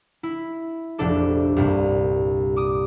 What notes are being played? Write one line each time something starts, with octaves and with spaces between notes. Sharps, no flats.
E4
F1 A#1 D4 A4 D5
C2 G2 A#2
D6 D#6